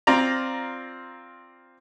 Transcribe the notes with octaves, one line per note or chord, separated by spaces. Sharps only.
C4 F4 D5 A#5